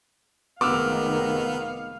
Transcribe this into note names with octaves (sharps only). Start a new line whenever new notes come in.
F1 D#3 G#3 B3 F5 D6 E6 F6